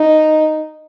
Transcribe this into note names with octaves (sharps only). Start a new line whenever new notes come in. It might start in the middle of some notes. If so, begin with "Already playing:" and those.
Already playing: D#4